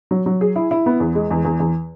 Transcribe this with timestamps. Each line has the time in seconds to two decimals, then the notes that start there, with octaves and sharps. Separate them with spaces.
0.11 F#3
0.26 F#3
0.41 G#4
0.56 E4
0.71 E4
0.86 B3
1.00 E2
1.15 G#3
1.31 E2
1.45 E2
1.60 E2